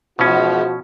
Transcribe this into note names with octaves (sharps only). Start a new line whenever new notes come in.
E2 G#2 B2 F3 C#4 F#4